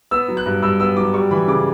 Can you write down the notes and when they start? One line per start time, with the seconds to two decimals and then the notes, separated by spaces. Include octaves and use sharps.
0.11 B3 E6
0.28 F#3
0.37 F#6
0.46 G2
0.62 G2 E6
0.80 B3 E6
0.97 F#3 D6
1.14 G3 C#6
1.31 E3 B5
1.47 C#3 D6